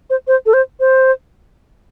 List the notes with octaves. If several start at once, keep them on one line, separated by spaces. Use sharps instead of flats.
C5
C5
A4
C5
C5